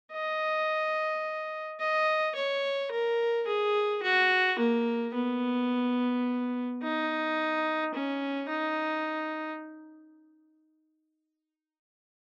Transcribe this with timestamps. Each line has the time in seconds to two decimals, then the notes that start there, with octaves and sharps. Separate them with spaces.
0.12 D#5
1.80 D#5
2.35 C#5
2.91 A#4
3.47 G#4
4.03 F#4
4.59 A#3
5.14 B3
6.83 D#4
7.94 C#4
8.49 D#4